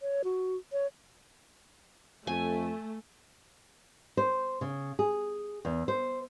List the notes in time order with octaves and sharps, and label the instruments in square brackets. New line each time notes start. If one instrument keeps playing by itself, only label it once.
[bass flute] C#5
F#4
C#5
[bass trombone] F2 [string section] A3 [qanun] G#5
[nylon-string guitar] C5
C#3
G#4
E2
C5